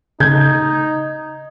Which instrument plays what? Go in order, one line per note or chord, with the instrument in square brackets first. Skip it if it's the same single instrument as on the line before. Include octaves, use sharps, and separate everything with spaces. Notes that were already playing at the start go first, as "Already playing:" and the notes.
[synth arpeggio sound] C#3 [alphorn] D#4 [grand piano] G6 G#6